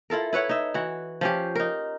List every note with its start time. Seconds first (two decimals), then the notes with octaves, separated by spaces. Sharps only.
0.10 E4 F4 A4 A#4
0.33 E4 B4 C#5 F#5
0.49 D#4 E5
0.74 E3 F#4
1.21 F3 C#4 G4
1.55 D#4 A#4